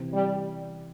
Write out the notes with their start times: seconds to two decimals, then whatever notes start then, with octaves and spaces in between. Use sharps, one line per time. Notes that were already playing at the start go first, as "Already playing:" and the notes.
Already playing: C3 E3 C4
0.14 G3